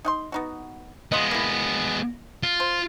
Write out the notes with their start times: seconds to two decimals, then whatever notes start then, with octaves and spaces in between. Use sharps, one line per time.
0.05 D#4 F#5 C6
0.32 B3 D#4 F#4
1.12 G#3 B3 F4 D#5
1.31 A#3 E4
2.43 F4
2.60 C5